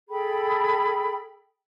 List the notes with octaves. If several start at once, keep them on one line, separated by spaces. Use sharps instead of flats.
G#4 A4 G5 B5